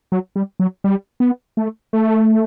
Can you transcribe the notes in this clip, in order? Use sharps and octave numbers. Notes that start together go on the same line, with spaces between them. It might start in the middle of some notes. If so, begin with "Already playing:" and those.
F#3
G3
F#3
G3
B3
A3
A3